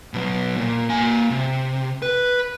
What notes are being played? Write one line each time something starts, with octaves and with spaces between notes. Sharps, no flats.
B2 F#3
A#2
A#3 G#5
C3
B4